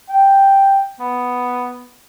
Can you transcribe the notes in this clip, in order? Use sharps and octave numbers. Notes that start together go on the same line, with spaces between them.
G5
B3